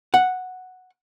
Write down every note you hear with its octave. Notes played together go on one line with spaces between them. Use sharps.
F#5